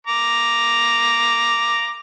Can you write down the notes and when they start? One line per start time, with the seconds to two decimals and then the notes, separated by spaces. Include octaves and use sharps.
0.07 A#5 D6